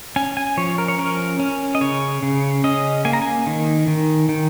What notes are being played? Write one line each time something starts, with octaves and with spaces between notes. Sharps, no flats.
C#4 G#5
G#5
F3 C#5
A#4
C#5
C#4 A#4
C#4
D#5
C#3 C#5
C#3
C#4 D#5
A#3 G#5
A#5
G#5
D#3
D#3
D#3